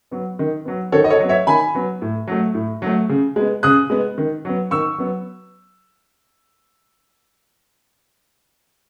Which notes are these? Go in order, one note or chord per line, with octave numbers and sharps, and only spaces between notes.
F#3 B3
D#3
F#3 B3
D#3 A4 C#5
D#5
A4 C#5
F#3 B3
C#5 E5
D#3 G#5 B5
F#3 B3
A2
F#3 A3
A2
F#3 A3
C#3
G#3 B3
C#3 D#6 F#6
G#3 B3
D#3
F#3 B3
D#3 C#6 E6
F#3 B3